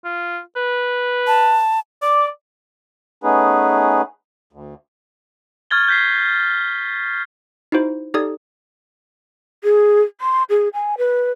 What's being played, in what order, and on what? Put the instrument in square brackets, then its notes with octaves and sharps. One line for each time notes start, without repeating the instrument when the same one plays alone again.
[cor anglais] F4
B4
[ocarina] A5
[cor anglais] D5 [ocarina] D6
[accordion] A3 B3 C#4 D#4 G#4 B4
D2
[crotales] C#6 F6 G#6 A6 G7
G6 B6 C7
[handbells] D#4 E4 F#4 C5
D#4 G4 A4 D5 D#6 G#6
[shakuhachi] G#4
C6
G#4
G#5
B4